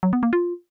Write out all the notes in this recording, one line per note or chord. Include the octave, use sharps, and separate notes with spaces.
F#3
B3
A#3
F4